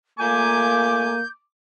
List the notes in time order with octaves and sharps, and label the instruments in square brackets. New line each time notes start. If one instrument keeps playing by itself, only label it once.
[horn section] A#2 A3 G#5 [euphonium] A#3 [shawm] D6 [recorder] G6